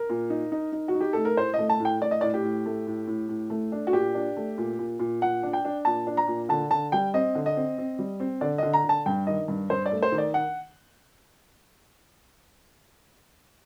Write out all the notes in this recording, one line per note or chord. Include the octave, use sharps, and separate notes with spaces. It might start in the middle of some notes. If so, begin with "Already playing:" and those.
Already playing: A#4
A#2
D#4
D#4
D#4
F#4
D#4
G4
A3 A4
A#4
A2 C5
D#5
A3
A5
A2
G5
A2 D5
D#5
A2 D5
G4
A2
A3
A2
A2
A2
A3
D4
F#4
A#2 G4
D4
A3
A#2
A#2
A#2
A#2 F#5
D4
G5
D4
A#2 A5
D4
A#5
A#2
D3 A5
D3 A5
G3 G5
C4 D#5
D3
D#5
C4
C4
G3
C4
D3 D5
D3 D#5
A#5
D3
A5
G2 G5
D#3 D#5
G2
G2 C5
D5
A3
C5
D#3
D5
F#5